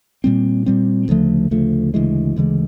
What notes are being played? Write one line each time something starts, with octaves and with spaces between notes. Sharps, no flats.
A#2 G3 C4
A#2 G3 C4
D2 C#3 F3 A3
D2 C#3 F3 A3
D2 C#3 E3 G#3
D2 C#3 E3 G#3